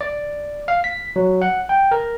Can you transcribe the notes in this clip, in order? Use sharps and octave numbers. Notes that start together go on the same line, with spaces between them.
D5
F5
B6
F#3
F#5
G5
A#4